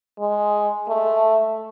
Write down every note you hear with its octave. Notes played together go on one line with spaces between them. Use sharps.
G#3
A3